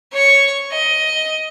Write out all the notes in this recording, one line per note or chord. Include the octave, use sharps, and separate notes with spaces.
C#5 C#6
D#5